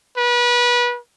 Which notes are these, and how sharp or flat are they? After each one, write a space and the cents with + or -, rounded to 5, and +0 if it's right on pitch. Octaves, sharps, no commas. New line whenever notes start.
B4 -30